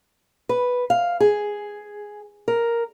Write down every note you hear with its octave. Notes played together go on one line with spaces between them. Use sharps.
B4
F5
G#4
A#4